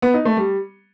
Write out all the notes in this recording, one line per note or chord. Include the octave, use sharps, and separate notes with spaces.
B3
D#4
A3
G3